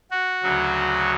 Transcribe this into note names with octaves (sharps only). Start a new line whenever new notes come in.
F#4
D2 C#3 F#3